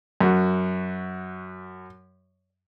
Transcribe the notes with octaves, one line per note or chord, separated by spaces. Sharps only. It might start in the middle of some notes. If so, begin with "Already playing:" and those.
F#2 F#4